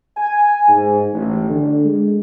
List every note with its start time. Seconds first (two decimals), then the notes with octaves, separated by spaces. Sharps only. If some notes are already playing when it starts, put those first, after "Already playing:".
0.16 G#5
0.68 G#2
1.12 A1
1.50 D3
1.84 G#3